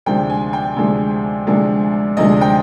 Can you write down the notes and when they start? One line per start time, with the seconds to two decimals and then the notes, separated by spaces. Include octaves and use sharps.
0.06 D2 C3 F3 G#3 D4 G5
0.30 G#5
0.53 G5
0.76 D2 C3 F3 G#3 D4
1.47 D2 C3 F3 G#3 D4
2.17 D2 C3 F3 G#3 D4 D#5
2.41 G5